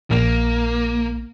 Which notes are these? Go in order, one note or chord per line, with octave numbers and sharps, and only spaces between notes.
A#1 A#3